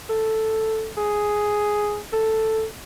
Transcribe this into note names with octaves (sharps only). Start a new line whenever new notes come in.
A4
G#4
A4